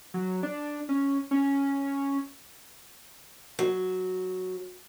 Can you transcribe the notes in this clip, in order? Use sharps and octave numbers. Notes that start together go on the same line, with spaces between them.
F#3
D4
C#4
C#4
F#3